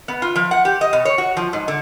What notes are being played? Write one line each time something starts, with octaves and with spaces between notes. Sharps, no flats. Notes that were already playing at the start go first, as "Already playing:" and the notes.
B3
F4
F3
F#5
G4
D#5
B2
C#5
F#4
F3
G#2
D3